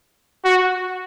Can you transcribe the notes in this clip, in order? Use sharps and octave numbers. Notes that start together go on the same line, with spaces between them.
F#4